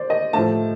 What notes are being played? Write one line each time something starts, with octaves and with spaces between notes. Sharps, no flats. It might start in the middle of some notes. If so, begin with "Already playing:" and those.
Already playing: C5 D5
D#5
A2 F3 A3 A5